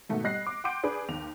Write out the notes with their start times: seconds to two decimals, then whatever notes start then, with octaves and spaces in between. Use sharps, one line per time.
0.09 G#2 B2 D#3 A3 A#3
0.24 G3 D#5 F#6 A#6 C7
0.47 D6
0.64 F#5 G5 C6 D6 G6 D7
0.83 D4 G#4 B4
1.08 D#2 F7